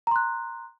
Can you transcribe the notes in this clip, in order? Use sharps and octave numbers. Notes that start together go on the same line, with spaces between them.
A#5 C6 F#6